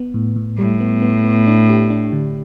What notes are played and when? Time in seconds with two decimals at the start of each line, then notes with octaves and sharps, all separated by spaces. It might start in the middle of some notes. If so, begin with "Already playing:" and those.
Already playing: B3
0.14 A2
0.36 A2
0.58 A2 G3
0.80 B3
1.02 B3
1.24 B3
1.47 D4
1.69 G4
1.90 D4
2.13 D3